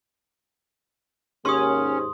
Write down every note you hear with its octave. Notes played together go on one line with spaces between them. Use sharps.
D#2 G#2 C#4 C6 D#6